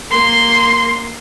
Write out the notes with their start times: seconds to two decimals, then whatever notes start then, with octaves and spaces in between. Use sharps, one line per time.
0.10 A#3 C6